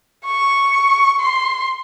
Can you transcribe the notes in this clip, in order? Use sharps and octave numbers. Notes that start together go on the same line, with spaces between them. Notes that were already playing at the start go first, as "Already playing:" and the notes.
C#6
C6